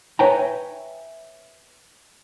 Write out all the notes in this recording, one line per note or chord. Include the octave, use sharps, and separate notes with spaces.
B4 C#5 E5 G5 G#5 A#5